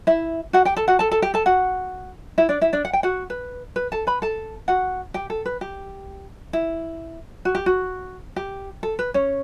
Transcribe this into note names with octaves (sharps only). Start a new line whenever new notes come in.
E4 E5
F#4 F#5
G4 G5
A4 A5
F#4 F#5
A4 A5
A4 A5
G4 G5
A4 A5
F#4 F#5
E4 E5
D4 D5
E4 E5
D4 D5
F#5
G5
F#4 F#5
B4
B4
A4 A5
B4 B5
A4 A5
F#4 F#5
G4 G5
A4
B4
G4
E4
F#4
G4
F#4
G4
A4
B4
C#4 C#5